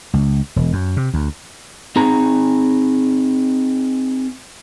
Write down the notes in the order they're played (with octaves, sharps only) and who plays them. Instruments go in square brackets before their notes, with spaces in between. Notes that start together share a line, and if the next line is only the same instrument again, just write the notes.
[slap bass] C#2
E1
F#2
C3
D2
[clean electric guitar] C4 D#4 G#4 A#5